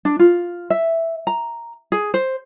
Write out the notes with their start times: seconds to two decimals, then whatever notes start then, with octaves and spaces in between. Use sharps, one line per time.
0.05 D4
0.19 F4
0.70 E5
1.27 A#5
1.92 G#4
2.14 C5